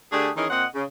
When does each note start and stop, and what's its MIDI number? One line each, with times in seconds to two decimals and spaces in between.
0.12 0.30 50
0.12 0.30 57
0.12 0.30 62
0.12 0.30 67
0.12 0.30 68
0.36 0.46 51
0.36 0.46 52
0.36 0.46 61
0.36 0.46 63
0.36 0.46 68
0.36 0.46 70
0.50 0.65 46
0.50 0.65 60
0.50 0.65 75
0.50 0.65 78
0.75 0.84 49